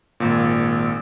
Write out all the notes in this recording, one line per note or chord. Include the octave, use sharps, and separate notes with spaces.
G#1 A#2